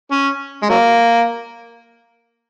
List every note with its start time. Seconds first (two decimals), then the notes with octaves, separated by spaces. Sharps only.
0.11 C#4
0.63 G#3
0.69 F#3 A#3